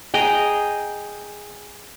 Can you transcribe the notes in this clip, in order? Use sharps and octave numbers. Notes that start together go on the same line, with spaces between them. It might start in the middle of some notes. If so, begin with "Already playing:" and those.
G#4 D#5 G5 A#5